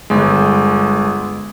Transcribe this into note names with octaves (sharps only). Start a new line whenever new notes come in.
G1 G#3